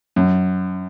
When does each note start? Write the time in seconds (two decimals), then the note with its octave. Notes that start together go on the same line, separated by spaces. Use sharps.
0.16 F#2